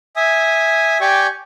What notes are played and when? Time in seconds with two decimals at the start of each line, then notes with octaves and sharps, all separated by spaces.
0.16 E5 G#5 D#6
1.01 G4 D5 G5 G#5 C#6